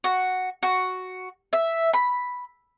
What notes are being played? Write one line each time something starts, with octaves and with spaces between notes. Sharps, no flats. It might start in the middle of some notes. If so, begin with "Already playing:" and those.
F#4
F#4
E5
B5